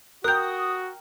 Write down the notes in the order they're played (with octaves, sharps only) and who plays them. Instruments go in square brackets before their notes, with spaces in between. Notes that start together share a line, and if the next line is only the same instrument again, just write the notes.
[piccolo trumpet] F#4 [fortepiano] A#4 G5 [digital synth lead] D#6 [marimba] F#6 G6